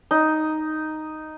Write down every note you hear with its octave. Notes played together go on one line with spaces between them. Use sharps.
D#4